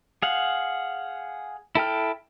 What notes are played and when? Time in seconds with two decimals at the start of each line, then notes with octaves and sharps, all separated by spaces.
0.22 G#4 F5 F#5
1.75 E4 A4 G5 F6